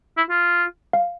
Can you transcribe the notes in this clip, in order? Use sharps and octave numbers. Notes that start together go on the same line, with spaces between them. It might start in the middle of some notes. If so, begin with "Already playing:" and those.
E4
F4
F5